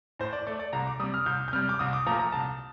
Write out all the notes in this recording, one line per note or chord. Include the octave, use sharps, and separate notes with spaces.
A2 C5
D5
A3 D5
D5
C2 A#5
D6
C3 G3 D#6
F6
C2 G6
G6
C3 G3 F6
D6
C2 D#6
D6
A#2 F3 A3 A#5
A#5
C2 A5